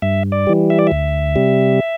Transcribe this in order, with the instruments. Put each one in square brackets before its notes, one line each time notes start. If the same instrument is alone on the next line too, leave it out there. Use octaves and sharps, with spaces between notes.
[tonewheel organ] G2 E5
D5
E3 G3
E5
D5
D2 E5
C3 G3